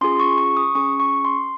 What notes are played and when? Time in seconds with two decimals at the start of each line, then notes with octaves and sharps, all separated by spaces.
0.01 C#4 F4 G#4 C6
0.20 C#6
0.38 C#6
0.57 D#6
0.75 C#4 G#4 C#6
1.00 C#6
1.25 C6